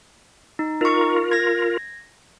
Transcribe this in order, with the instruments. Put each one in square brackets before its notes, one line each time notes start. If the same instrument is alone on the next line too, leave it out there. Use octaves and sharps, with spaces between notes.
[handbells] D#4
[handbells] D#4 C#6 [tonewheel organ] F4 A#4
[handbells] G#6 A#6